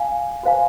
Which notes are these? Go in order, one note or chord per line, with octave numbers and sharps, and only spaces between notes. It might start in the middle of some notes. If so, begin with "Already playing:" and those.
Already playing: F5 G#5
F#4 C5 F5 G#5